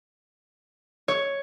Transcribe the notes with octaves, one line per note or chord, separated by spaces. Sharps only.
C#5